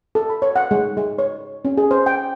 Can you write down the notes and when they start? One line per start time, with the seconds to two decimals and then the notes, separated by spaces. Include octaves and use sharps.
0.15 A4
0.29 B5
0.42 C#5
0.56 F#5
0.71 G#3
0.97 G#3
1.19 C#5
1.65 C#4
1.78 G#4
1.91 C5
2.06 G5